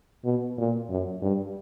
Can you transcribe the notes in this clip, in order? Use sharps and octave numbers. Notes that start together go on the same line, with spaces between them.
B2
A#2
F#2
G2